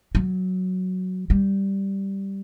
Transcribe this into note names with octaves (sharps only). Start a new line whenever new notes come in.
F#3
G3